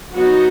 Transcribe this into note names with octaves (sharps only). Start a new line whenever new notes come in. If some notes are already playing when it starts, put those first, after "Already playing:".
F#3 B3 D#4 F#4